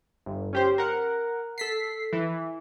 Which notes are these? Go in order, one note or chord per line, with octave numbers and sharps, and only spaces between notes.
G1
C#4 G4 C5
A#4 F#5
A4 B6 C7
E3